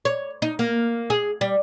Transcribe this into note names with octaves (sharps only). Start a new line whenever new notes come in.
C#5
D#4
A#3
G#4
G3